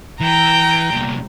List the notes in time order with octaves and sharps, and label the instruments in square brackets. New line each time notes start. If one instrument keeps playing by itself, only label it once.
[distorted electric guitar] E3 [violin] G5 A#5
[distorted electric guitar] C2 A#2